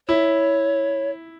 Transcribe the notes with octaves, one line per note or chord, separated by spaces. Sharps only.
E4 C#5